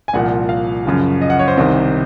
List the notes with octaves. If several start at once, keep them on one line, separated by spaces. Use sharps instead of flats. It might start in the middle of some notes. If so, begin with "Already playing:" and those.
G#5
C2 A#2 F3 F#5
F5
F#2 C#3 F3
D#5
F#5
C#5
C5
C2 C3 D#3